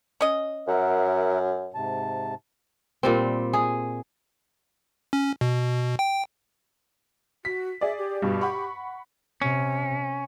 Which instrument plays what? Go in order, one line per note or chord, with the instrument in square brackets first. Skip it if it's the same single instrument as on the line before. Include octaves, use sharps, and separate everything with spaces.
[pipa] C#4 D#5
[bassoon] F#2 [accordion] A#4 E5 F#5
[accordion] G#2 C3 A5
[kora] A#2 G3 C4
G#4
[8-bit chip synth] C#4
B2
G5
[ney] F#4 [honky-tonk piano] B6
[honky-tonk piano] G#4 D5 [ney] E5
[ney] G4
[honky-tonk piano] G2 B2 G3
F#5 B5 C#6
[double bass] C3 [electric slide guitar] C#4